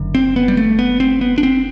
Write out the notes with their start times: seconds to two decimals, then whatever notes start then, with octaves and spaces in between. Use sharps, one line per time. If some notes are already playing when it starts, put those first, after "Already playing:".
Already playing: F#1 F#2 D3
0.15 C4
0.36 B3
0.48 G3
0.57 A3
0.79 B3
1.00 C4
1.21 B3
1.38 D4
1.43 C4